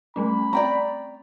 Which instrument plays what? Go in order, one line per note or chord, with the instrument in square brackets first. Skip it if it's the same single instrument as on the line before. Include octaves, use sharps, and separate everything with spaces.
[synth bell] G3 A3 C#4 [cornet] B5
[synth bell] C4 [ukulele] D5 G5 A#5